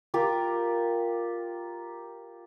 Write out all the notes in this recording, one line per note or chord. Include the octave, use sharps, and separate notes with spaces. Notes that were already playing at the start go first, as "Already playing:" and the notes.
F4 G4 A#4 D6